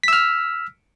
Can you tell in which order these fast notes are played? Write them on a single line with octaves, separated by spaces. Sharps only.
B6 E6 F6